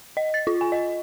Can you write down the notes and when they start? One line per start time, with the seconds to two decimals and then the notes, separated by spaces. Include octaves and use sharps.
0.17 D#5
0.34 A6
0.47 F4
0.61 G#5
0.72 D#5